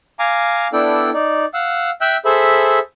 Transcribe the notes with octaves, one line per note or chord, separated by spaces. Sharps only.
F5 G#5 A#5 D6
B3 D4 E4 A4 D5 G5
D#4 D5
F5 F#5 E6
E5 G5 E6 F#6 G6
G#4 A4 C5 E5 B5